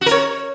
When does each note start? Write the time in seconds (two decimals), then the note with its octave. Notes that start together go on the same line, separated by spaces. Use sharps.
0.01 F#4
0.06 A#4
0.11 C#5